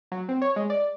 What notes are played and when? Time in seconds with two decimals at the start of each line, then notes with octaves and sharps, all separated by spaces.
0.12 F#3
0.29 C4
0.42 C#5
0.56 G#3
0.70 D5